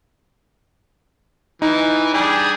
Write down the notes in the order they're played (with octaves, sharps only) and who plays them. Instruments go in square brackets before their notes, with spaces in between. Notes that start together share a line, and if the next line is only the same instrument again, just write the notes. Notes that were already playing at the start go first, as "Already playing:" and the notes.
[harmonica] E3 [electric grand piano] D#4
[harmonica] G3 D4 G#4